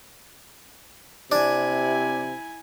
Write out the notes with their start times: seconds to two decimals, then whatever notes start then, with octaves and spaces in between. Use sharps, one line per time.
1.32 C3 D4 E4 G#5